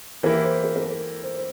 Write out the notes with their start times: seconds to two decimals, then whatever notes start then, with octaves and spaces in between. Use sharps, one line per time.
0.23 E3 A#3 E4 G4 A#4
0.44 C5
0.64 A#4
0.76 A#4
0.84 A4
1.23 C5
1.36 C5